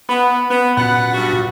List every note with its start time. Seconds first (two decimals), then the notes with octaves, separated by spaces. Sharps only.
0.09 B3 B5
0.50 B3
0.77 F#2 A#2 F#5
1.14 G2 F#4